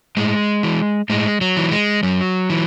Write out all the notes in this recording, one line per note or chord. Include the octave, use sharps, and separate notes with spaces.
A2 G#3
E3
A2 G#3
F#3
E3
G#3
F#2 F#3
E3